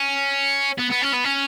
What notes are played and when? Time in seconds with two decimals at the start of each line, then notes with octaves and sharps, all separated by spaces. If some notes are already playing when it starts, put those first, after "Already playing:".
Already playing: C#4
0.79 B3
0.92 B3
1.03 C#4
1.14 B3
1.25 C#4